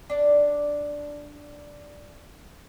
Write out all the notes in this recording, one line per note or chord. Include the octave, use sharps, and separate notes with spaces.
D4 D5